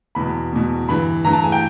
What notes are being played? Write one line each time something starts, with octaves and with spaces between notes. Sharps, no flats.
E2 B2 B5
E2 B2
G2 E3 B5
G2 E3 A#5
A5
G#5
G5